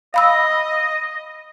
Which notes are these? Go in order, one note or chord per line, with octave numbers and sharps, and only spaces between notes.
D#5 F5 B5 E6